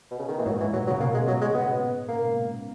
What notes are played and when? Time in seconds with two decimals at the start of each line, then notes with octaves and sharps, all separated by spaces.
0.11 B2
0.19 C#3
0.28 D#3
0.38 A#2 E3
0.46 G#2 F#3
0.60 E3
0.64 G#2
0.73 A#2 F#3
0.87 F#3
0.90 C#3
1.00 B2 A#3
1.14 G#3
1.27 F#3
1.41 G#3
1.54 B3
2.08 A#3